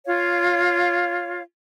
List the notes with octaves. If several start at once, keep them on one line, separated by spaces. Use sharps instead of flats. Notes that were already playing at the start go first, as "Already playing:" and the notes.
F4 C#5 F5